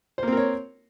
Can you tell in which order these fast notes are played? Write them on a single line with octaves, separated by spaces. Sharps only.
C5 A#3 C4 A#4 C#5